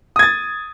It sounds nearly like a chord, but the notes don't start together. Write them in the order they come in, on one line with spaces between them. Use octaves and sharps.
D#6 G#6 A6